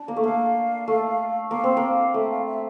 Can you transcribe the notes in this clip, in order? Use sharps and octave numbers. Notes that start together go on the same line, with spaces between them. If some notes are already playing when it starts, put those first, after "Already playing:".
Already playing: D4
A#3
A3
A#3 F5
A3
A#3 F5
C4
A#3
A3 E5
F5
E5